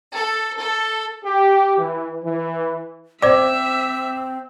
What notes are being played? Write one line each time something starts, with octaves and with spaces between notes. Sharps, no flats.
A4
A4
G4
E3
E3
C4 C5 D5 E5 D6